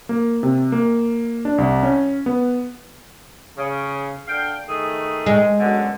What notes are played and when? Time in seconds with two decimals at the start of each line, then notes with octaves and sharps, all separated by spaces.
0.09 A#3
0.43 C3
0.72 A#3
1.45 D4
1.58 C2
1.83 C#4
2.26 B3
3.56 C#3
4.27 D3 F5 G5
4.67 D#3 A3 G#4
5.26 G#3
5.58 F#2 B2 D3